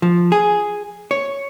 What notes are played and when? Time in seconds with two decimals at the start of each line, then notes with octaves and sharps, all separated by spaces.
0.02 F3
0.32 G#4
1.11 C#5